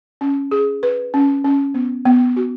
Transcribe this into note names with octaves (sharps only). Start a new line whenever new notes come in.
C#4
G#4
B4
C#4
C#4
B3
B3
F#4